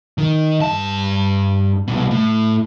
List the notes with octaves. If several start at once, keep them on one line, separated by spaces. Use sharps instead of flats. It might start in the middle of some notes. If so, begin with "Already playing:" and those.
D#3
G2 A5
C2 B2
A2